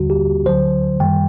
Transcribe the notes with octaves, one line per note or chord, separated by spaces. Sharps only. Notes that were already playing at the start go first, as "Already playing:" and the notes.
Already playing: D#2 D3 G3 F#4
G4
D2 D3 F#3 C5
F#2 D#3 G3 G5